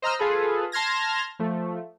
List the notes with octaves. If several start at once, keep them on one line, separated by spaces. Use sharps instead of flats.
C5 D#5 A#5 E6 F6
F4 G#4 A4 B4
A5 C6 F6 G#6 A#6
F3 A3